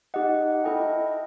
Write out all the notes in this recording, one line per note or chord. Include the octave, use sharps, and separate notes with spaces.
D#4 G4 D#5 F#5
E4 A4 D#5 G5